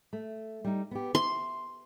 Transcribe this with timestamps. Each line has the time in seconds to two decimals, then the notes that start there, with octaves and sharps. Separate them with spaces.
0.13 A3
0.64 G3 D#4
0.91 B3 G4
1.15 E5 C6